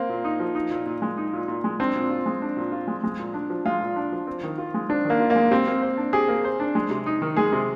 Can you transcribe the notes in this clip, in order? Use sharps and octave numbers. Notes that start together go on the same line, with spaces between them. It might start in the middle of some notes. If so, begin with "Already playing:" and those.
Already playing: A#3 C4
A#2
D#4
F3
D#4
A#2
A#2
G#3
D#4
A#2
A#2
G#3
C4 D4
A#2
F4
G#3
D4
A#2
F4
G#3
G#3
A#2
D4
F3
G#3 F4
A#2
D4
F3
C4
D#3
F4
G#3
C4 D4
D#3
A#3
F4
A#3
G#3
C4 G4
A#3
C5
D4
G4 G#4
A#3
C5
D4
G#3
C3
D#4
D#3
G#3 G#4
C3